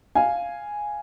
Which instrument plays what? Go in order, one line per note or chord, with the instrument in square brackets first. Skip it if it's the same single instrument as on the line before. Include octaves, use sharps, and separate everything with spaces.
[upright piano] F5 G#5